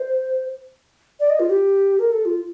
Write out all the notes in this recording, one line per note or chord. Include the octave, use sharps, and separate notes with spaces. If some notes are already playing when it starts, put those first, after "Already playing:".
Already playing: C5
D5
D#5
F4
G4
A#4
A4
F4